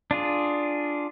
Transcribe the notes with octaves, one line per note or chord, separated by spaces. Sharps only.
D4 F4 G#4